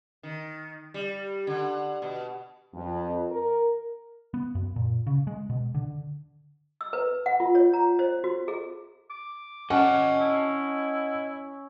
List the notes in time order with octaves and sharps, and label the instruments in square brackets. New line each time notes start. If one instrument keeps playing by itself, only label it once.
[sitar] D#3
G3
D3
B2
[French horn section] F2
A#4
[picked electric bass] B3
F#2
A#2
C#3
G#3
B2
D3
[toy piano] E6
B4
F#5
F4
C#5
A#5
C5
F#4
G#4
[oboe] D6
[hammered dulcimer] C#4 [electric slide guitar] D#5 A5 [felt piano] F#5
[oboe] E4